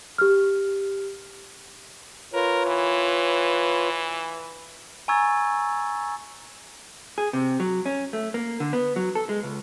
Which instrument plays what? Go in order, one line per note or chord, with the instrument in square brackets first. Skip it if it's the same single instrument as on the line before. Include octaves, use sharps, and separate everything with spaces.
[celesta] G4 F6
[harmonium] F4 B4 C#5 [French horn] A#4
[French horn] E3
[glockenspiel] G#5 A#5 C#6 E6 G#6 A6
[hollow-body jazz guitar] G#4
C3
F#3
C#4
A3
A#3
D3
B3
F#3
A4
G#3
C#2